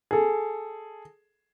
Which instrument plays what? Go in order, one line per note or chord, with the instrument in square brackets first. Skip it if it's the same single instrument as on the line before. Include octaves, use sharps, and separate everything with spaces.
[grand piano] G#4 A4